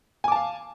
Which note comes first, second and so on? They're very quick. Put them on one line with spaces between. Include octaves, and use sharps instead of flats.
G#5 D6 A5 F5